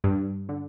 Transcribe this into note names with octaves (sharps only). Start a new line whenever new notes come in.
G2
D3